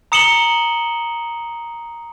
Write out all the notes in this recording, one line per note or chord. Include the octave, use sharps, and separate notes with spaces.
A#5 D#6 C#7 E7 F#7 G7